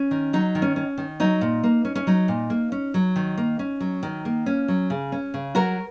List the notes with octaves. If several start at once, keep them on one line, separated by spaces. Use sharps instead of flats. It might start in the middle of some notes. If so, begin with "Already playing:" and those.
Already playing: C#4
D#3
F#3 D#4
D#3
C#4
C#4
D#3
F#3 D#4
A#2
A#3
C#4
C#4
F#3 D#4
A#2
A#3
C#4
F#3
D#3
A#3
C#4
F#3
D#3
A#3
C#4
F#3
C#3
C#4
C#3
F#3 F#4 A#4